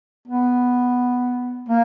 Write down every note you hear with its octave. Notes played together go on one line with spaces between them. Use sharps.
B3
A#3